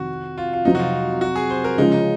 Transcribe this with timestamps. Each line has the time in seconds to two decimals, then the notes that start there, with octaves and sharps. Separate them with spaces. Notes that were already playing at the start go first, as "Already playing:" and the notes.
Already playing: F2 C3 D#3 F#4
0.38 F4
0.53 F4
0.65 F2 C3 F#3 C4 D#4
0.75 F#4
0.79 F4
1.21 F#4
1.36 G#4
1.50 C5
1.64 A#4
1.78 C#3 F3 G#3 C#4 D#4 F4
1.92 D#4